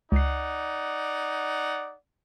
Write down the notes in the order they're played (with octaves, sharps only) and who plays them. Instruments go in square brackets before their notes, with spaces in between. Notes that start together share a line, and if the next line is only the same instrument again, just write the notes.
[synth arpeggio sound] C#2 C7 [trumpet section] D#4 D5 F#5